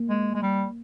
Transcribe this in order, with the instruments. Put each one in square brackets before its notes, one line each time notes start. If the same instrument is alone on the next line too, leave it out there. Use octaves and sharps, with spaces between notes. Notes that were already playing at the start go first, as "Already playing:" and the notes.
Already playing: [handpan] A#3
[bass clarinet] G#3
G#3
G3